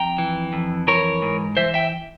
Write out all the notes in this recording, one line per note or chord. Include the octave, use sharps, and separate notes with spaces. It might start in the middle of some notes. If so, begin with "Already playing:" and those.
Already playing: F2 G5 A#5
E3
F2
E3 A#4 C#5
G#2
E3 C5 E5
E5 G5